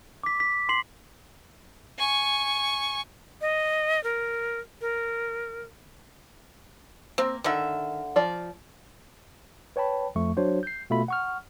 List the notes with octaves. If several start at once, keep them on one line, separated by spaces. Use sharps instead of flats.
D6 B6
B6
C6 C7 F#7
G#5 C#6
D#5
A#4
A#4
A#3 C4
D3 D#3 E5
F3 D5
B4 C#5 G5 A5 B5
F2 F3 A3 C#6
F#3 D4 F#4 C5 C#5
G6 C7
B2 A3 F4 B5
F#5 C#6 F6